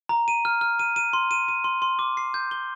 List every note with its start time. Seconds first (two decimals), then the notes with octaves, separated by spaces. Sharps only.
0.09 A#5
0.28 D#7
0.45 F6
0.61 F6
0.79 D#7
0.96 D#7
1.13 C6
1.31 D#7
1.48 D#7
1.64 C6
1.82 C6
1.99 D6
2.17 C7
2.34 G6
2.51 G7